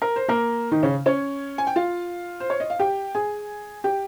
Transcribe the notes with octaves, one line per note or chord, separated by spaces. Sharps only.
A#4
C5
A#3 A#4
D#3 D#4
C#3 C#4
C#4 C#5
G#5
G5
F4 F5
C5
C#5
D#5
F5
G4 G5
G#4 G#5
G4 G5